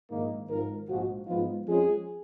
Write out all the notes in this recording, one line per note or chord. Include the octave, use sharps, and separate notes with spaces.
A#1 G#2 D#3 A#3 D#4
G#1 G#2 F3 A#4
A#1 G#2 F3 F#4
G#2 F3 B3 D#4 F4
F2 F3 G#3 C#4 G#4